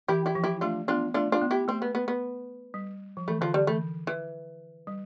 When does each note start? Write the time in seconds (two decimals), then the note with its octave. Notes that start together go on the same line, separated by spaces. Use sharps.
0.08 E3 E4 G4
0.26 E4 G4
0.35 F3
0.44 E4 G4
0.61 A3 D4 F4
0.88 B3 D4 F4
1.14 A3 D4 F4
1.32 D4 F4
1.42 B3
1.51 E4 G4
1.68 A3 C4
1.82 B3
1.95 B3
2.08 B3
2.74 G3
3.17 F3
3.28 E3 A3
3.41 D3 F3
3.54 D3 G3
3.67 E3 A3
4.07 E3
4.87 G3